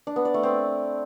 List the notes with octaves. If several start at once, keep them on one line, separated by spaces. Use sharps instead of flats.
D4
B3
D5
A3
C4